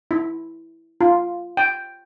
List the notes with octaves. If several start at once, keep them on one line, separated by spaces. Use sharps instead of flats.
E4
F4
G5